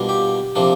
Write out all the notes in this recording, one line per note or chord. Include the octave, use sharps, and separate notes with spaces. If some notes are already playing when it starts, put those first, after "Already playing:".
Already playing: B2 G3 A#3 D4 F4
G4
C3 F3 A#3 D4